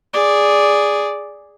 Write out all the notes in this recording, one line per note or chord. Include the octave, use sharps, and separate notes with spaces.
G#4 D5